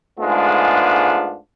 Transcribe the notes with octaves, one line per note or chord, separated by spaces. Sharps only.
G#2 G#3 A3 B3 D4 F4